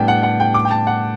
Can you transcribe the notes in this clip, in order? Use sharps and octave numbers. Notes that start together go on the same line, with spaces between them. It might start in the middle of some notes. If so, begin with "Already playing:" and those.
Already playing: A2 G3 B3 D4 G5
F#5
F#5
G5
D6
G5
A5
F#5